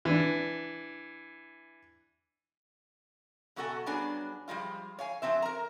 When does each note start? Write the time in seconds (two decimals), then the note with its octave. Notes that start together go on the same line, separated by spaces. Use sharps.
0.05 E3 D4
3.56 B2 F#3 F#4 A4 F#5 G#5
3.86 G2 F#3 B3 D4 G#4 G#5
4.48 F3 G3 G#3 F4
4.99 C#5 F5 G#5
5.22 F3 F#3 C4 E5
5.42 A#4 A#5